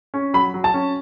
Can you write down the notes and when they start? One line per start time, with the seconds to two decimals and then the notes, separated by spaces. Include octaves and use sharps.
0.14 C#4
0.33 F#3 B5
0.54 F#3
0.64 A5
0.74 C#4